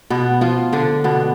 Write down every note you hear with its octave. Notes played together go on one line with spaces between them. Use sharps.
B2 B3
F3 F4
D3 D4
B2 B3